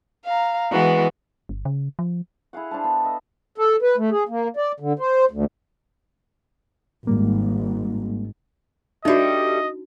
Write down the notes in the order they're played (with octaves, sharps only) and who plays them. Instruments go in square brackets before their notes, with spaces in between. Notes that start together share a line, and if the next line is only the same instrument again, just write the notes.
[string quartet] F5 A#5
E3 G#3 B3 F#4
[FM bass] G1
C#3
F3
[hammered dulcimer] E4 G#4 F5 F#5
D4 C5 F5 A5
B3
D#5 E5
[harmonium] A4
B4
A3
G#4
A#3
D5
D3
C5
D2
[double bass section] G#1 G#2 [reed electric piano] G3 A#3
[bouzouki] G3 A3 [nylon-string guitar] D4 [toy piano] D#4 F#4 [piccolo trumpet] D#5